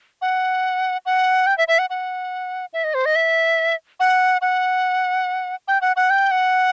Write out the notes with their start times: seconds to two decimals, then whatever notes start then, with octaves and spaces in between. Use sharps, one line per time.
0.22 F#5
1.06 F#5
1.47 G5
1.58 E5
1.68 E5
1.79 F#5
1.90 F#5
2.73 E5
2.84 D#5
2.94 C5
3.06 D#5
3.16 E5
4.00 F#5
4.42 F#5
5.68 G5
5.81 F#5
5.96 F#5
6.10 G5
6.31 F#5